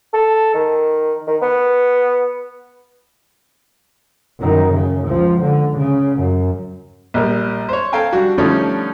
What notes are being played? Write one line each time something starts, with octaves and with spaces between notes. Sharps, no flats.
A4
D#3
D#3
B3
F#2 D#3
C#3
C#2 F3
D3
C#3
F#2
A#1 G3 A#4
C5 C#5
A4 F5 G5 G#5 A#5
G3 D4 F#4
D3 F3 G3 A3 C#4 D#4